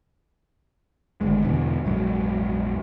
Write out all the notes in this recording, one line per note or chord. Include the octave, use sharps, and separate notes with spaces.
G#1 D2 G#3
E2 B2 D3 E3
A#1 F2 G#2 F#3